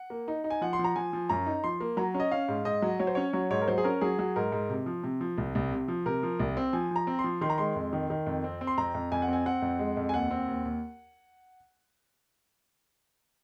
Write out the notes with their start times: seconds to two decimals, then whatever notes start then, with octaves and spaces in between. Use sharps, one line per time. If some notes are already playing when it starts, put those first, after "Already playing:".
Already playing: F#5
0.10 A#3
0.28 D#4
0.44 D#4
0.50 G#5
0.61 F3 F#5
0.73 C6
0.79 F3
0.84 A#5
0.96 F3 G#5
1.13 F3
1.29 F#2 A#5
1.46 D#4
1.64 F3 C6
1.81 A#3
1.97 F#3 A#5
2.14 C#4
2.20 D#5
2.31 C#4 F5
2.48 G#2
2.65 G#2 D#5
2.82 F#3
2.99 F#3 C#5
3.07 C5
3.15 C#4 C#5
3.33 F#3 C#5
3.50 G#2 C#5
3.62 A#4
3.68 F#3 C5
3.78 G#4
3.84 C#4 A#4
4.01 F#3 G#4
4.19 F#3
4.36 G#2 A#4
4.52 G#2
4.70 C3
4.86 F3
5.03 C3
5.21 F3
5.38 C2
5.55 C2
5.72 C3
5.88 F3
6.06 C3 A#4
6.23 F3
6.40 C2
6.57 C4
6.73 F3 G#5
6.91 F3 A#5
7.07 C4
7.19 C6
7.24 F3
7.41 D#3 C6
7.50 A#5
7.58 G#3 C6
7.76 F2
7.93 D#3
8.10 D#3
8.27 F2
8.44 C4
8.61 C4
8.67 C6
8.78 F2 A#5
8.95 F2
9.12 F2 G#5
9.22 F#5
9.28 C4 G#5
9.46 C4 F#5
9.62 F2
9.79 G#3
9.97 F2
10.09 G#5
10.14 D#2 F#5
10.31 C4
10.48 D#2
10.65 D#2